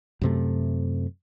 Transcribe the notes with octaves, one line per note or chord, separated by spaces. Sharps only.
F#2 C3 A3